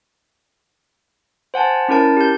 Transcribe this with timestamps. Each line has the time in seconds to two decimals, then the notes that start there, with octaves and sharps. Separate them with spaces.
1.54 C5 F#5 G#5 A5
1.89 C#4 E4 A#4 A5
2.17 G4 G6